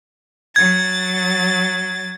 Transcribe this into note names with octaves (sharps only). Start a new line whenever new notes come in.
F#3 G#6 A6